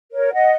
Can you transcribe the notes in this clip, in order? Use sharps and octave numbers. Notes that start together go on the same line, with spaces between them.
A#4 C#5
D#5 F#5